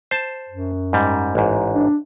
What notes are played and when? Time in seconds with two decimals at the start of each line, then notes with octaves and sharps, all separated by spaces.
0.11 C5 A5
0.49 F#2
0.93 G#2 G3
1.35 A1 G#2
1.73 D4